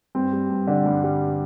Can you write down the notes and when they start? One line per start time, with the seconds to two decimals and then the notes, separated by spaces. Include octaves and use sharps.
0.15 G2 C4
0.33 G3
0.50 G2
0.67 D3 D4
0.86 G2
1.03 G3